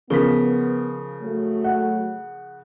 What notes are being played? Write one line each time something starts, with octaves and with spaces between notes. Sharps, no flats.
C#3 F3 B3 A#4 B6
F#3 A3
F#5